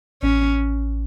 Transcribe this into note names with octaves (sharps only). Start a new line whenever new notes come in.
A1 C#4